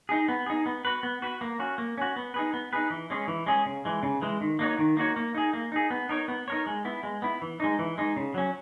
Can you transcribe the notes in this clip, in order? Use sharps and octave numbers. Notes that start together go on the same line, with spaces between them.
D#4 G#4
B3
D#4 G#4
B3
F#4 B4
B3
F#4 B4
A#3
C#4 F#4
A#3
C#4 F#4
B3
D#4 G#4 B4
B3
D#4 G#4 B4
E3
G#3 C#4 G#4
E3
G#3 C#4 G#4
C#3
E3 G#3
C#3
E3 G#3
D#3
A#3 D#4 F#4 C#5
D#3
A#3 D#4 F#4 C#5
A#3
D#4 G#4
A#3
D#4 G#4
B3
D#4 A#4 C#5
B3
D#4 A#4 C#5
G#3
B3 E4
G#3
B3 E4
E3
G#3 D#4
E3
G#3 D#4
C#3
F#3 C#4